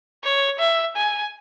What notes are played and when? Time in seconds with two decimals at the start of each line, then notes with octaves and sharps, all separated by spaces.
0.24 C#5
0.60 E5
0.97 G#5